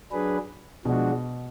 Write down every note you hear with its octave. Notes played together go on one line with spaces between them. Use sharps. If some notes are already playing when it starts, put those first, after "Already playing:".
F#3 D4 G#4 B4
B2 F3 G#3 D4 F#4